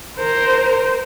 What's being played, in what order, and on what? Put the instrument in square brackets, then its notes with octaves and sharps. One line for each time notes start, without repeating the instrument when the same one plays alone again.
[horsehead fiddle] A#4 C5